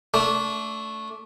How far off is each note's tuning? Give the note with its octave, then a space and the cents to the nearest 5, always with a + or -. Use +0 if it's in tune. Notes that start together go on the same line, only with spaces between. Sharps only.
A3 +0 D4 -25